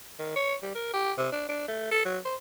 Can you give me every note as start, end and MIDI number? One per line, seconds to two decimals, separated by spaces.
0.19 0.31 51
0.36 0.55 73
0.62 0.73 55
0.75 0.92 70
0.93 1.12 67
1.18 1.29 48
1.32 1.45 62
1.48 1.66 62
1.68 1.86 57
1.91 2.02 69
2.05 2.18 54
2.25 2.35 72